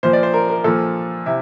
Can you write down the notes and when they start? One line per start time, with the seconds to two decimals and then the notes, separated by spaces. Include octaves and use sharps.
0.03 A#2 F3 C5
0.13 D5
0.23 C5
0.34 A#4
0.49 A#4
0.64 A#2 F3 A4
1.26 C3 E4